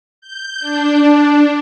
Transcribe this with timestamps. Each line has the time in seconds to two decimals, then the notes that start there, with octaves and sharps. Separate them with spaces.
0.21 G6
0.59 D4